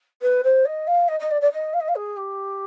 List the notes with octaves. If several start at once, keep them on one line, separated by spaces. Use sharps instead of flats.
B4
C5
D#5
F5
D#5
D#5
D5
D5
D#5
F5
D#5
F5
G#4
G4